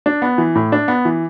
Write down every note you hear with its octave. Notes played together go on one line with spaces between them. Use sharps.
D4
B3
E3
A2
D4
B3
E3